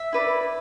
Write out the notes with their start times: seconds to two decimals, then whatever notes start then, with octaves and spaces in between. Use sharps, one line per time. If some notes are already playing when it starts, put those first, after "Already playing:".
Already playing: E5
0.13 E4 B4 D5